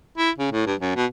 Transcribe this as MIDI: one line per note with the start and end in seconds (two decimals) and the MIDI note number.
0.18 0.30 64
0.38 0.51 49
0.52 0.66 45
0.66 0.75 43
0.80 0.94 42
0.96 1.06 47